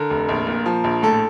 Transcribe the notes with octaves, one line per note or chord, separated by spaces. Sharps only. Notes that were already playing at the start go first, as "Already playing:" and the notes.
Already playing: D3 A#4
F1
A#1
A#2
F3
A#1
A2 A4